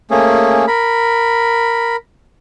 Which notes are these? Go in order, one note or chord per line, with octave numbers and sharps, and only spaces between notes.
A3 A#3 C#4 G#4
A#4 B5